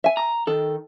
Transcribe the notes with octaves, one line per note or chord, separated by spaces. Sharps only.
E5 G#5
A#5
D#3 A4